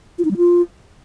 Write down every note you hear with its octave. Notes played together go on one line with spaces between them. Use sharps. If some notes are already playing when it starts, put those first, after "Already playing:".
F4
D#4
G3
F4